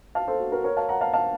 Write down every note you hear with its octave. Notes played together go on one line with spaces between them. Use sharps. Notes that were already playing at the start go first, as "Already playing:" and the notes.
F5 A5
A4 C5
F#4
F#4 A#4
A#4 C#5
F5 A5
F#5 A#5
F5 A5
F5 A5